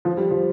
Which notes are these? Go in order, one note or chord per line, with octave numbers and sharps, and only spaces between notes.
F3
G3
F3